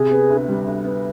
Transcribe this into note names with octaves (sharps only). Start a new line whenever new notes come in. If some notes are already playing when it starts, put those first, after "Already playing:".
Already playing: C3 G#4
B3
D2
G3
D2
B3